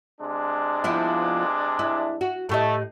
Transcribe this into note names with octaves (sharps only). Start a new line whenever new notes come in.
C3 G#3 D4
F3 B3 E4
E4
F#4
A2 A3 G4 D#5